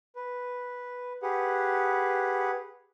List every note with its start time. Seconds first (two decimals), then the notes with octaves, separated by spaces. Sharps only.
0.16 B4
1.23 G4 G#4 B4 F#5